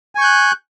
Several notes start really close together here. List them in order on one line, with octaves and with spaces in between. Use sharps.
G#5 C#6 G6 F#6